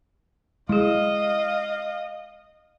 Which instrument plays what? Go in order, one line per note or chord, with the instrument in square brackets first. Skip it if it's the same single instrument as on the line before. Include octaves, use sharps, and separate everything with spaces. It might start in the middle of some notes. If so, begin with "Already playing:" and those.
[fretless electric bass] G#3 [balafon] E4 G#4 [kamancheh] D#5 [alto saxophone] F5